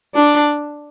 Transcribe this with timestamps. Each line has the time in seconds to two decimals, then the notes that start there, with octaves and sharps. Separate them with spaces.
0.15 D4